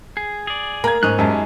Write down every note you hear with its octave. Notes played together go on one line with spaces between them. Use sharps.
G#4
G#4 D5
A#3 A#5 G#6
G#2 C#4 D#4 F#6
F#2 F#3 G#3 G4 A5